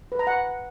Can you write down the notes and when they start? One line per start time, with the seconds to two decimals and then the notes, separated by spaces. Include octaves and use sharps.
0.12 B4
0.19 A#5
0.27 F#5